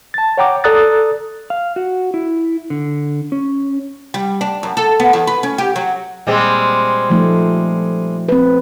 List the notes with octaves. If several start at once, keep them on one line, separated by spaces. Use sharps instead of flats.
A5 A6
C#5 F#5 G5 A#5 D6
A4 D5 A#5 D#6 F#6 A6
F5
F#4
E4
D3
C#4
G3
D4
F#2
A4
B3
E2
B4
C#4
G4
F#3
A#2 G3 G#3 C4
F3 A3 D#4
C4 B4